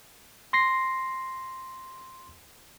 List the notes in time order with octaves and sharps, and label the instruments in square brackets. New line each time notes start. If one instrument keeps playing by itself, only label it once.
[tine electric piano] C6 A#6 C7